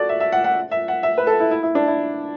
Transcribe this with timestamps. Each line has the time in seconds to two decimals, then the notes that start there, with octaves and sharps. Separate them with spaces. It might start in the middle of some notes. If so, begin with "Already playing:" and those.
Already playing: F#4 A4 D5
0.09 E5
0.20 E5
0.32 F#5
0.44 F#5
0.71 E5
0.88 F#5
1.03 E5
1.18 B4
1.27 A4
1.40 E4
1.51 E4
1.63 E4
1.75 D4
1.87 E4